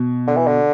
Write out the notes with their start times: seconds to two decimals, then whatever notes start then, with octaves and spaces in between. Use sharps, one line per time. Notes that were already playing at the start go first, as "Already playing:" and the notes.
Already playing: B2
0.27 D3
0.37 E3
0.47 D3